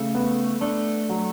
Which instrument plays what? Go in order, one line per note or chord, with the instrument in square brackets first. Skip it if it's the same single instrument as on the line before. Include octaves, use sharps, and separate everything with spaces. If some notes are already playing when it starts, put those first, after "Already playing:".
Already playing: [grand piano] C#3 [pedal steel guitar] A3
[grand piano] B3
[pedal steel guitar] A3 [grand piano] D4
[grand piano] F#3